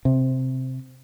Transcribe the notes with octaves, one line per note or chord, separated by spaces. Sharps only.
C3